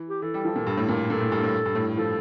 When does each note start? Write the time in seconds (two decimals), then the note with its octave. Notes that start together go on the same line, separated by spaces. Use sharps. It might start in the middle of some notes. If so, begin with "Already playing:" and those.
Already playing: E3
0.09 G4
0.22 E3 A4
0.34 G3
0.45 F3
0.56 A#2
0.67 G2
0.78 A2
0.89 A#2
1.10 A#2 A4
1.21 A2
1.32 G2
1.44 A2
1.65 G2
1.75 A2
1.98 F3 A4